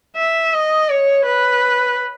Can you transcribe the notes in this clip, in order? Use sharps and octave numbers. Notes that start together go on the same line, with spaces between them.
E5
D#5
C#5
B4